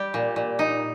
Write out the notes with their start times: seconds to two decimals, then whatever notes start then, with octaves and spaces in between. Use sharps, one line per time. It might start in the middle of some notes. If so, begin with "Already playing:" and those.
Already playing: G3 G4
0.14 A#2
0.36 A#2
0.59 D#4